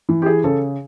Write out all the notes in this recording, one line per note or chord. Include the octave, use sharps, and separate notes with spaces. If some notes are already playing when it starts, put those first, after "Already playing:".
E3
G4
G#4
C#3 A4